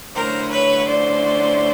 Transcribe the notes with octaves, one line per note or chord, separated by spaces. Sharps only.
D3 F#3 A3 C#4 E4 A#4 C5
B4 C#5
C5 D5